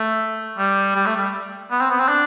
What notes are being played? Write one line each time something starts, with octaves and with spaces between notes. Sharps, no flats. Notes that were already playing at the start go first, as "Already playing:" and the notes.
Already playing: A3
G3
G3
A3
G3
B3
C4
B3
C4
D4